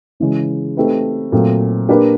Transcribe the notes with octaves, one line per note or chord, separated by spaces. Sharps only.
C#3 E3 G#3 C#4
A3 C4 D#4 G4 B4
A#2 F#3 A3 C4
A#3 D4 G4 B4 D5